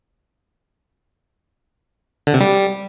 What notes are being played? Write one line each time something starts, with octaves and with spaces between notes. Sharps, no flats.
D3
C3
G3